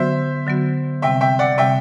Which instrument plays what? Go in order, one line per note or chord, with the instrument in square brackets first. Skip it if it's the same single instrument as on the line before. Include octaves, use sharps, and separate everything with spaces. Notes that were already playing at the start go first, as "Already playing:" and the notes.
Already playing: [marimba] D3 F#3 B3 F#4 [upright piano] C5 E5
[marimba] D3 F#3 B3 F#4
[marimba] C3 G3 C4 [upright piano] E5 G5
[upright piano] E5 G5
D5 F#5
[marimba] C3 G3 C4 [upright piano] E5 G5